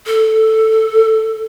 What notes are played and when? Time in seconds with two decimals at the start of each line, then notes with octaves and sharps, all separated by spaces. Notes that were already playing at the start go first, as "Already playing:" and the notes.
0.06 A4